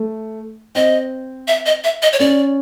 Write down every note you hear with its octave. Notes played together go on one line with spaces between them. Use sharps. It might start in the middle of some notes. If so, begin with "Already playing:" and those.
Already playing: A3
C4 D#5
E5
D#5
E5
D#5
C#5
C#4 D5